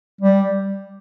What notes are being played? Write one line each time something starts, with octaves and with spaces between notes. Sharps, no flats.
G3